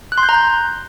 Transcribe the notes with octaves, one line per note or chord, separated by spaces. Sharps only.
F#6
C6
G6
A#5
G6